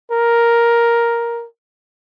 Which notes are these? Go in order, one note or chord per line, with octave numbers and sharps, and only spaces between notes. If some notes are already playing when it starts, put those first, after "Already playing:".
A#4